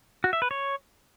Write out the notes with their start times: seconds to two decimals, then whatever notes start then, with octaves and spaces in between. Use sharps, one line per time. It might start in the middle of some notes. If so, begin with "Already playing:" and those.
0.24 F#4
0.33 E5
0.42 B4
0.51 C#5